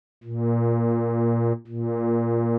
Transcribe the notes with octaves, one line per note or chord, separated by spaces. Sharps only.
A#2
A#2